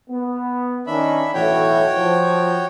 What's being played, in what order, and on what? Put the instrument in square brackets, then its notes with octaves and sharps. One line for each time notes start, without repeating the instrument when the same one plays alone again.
[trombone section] B3
[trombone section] D#3 C#4 [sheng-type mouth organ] D4 E5 B5
[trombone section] B1 A2 E3 [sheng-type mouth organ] F#4 C#5 G5
[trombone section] F3